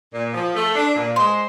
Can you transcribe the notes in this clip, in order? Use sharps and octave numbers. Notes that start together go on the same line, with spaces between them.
A#2
F3
A3
D4
A#2
G#3 C5